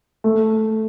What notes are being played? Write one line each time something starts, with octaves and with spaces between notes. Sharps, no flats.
A3